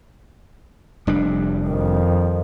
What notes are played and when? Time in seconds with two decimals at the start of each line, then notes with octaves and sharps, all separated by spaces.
1.07 F1 G3 D4
1.67 F2 D#3